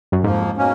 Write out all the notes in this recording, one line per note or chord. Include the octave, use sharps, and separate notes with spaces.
F#2
F2 G#2 F3 A#3
B2 A#3 C#4